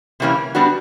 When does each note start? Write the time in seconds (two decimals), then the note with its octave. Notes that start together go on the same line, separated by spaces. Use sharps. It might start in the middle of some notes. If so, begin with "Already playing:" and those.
0.20 C3 E3 G3 A#3 C#4
0.55 G3 B3 D4 F#4